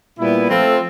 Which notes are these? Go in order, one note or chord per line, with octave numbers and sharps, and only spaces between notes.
A#2 G3 B3 E4
F3 A3 C4 F4 A4